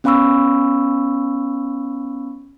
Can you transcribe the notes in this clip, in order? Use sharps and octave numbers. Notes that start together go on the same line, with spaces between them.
B3 C#4 F5 B5 C#6 E6